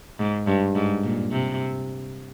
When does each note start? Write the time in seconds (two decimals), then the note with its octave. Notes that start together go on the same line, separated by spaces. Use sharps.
0.20 G#2
0.47 G2
0.75 G#2
1.04 A#2
1.32 C3